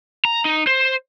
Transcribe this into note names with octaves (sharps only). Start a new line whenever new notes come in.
A#5
D#4
C5